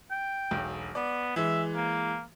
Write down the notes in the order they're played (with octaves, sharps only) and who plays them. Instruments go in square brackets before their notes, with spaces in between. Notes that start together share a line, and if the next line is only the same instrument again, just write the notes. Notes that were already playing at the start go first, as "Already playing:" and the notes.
[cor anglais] G5
[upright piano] E1 B1
[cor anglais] B3 [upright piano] D5
[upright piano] E3 G#3 [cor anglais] E5
[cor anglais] A#3